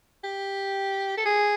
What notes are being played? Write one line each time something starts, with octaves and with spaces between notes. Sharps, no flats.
G4
A4
G#4